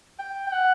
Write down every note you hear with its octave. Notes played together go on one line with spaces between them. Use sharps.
G5
G5
F#5